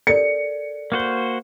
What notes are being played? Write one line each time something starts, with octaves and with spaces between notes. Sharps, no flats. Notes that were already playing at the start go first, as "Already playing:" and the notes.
A4 A#4 D5 C#7
A#3 F#4 C5